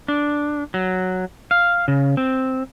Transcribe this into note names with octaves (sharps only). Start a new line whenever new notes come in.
D4
F#3
F5
C#3
C4